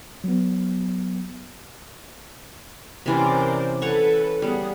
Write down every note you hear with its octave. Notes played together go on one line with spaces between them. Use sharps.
F#3 B3
C3 E3 C#4 A#4 C5 D5
A4 B4 C#5 F#5 C#6
G3 B3 G#4 F#5